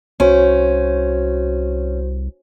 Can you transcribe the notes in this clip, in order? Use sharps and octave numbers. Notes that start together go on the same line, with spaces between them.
C2 C#4 F#4 C5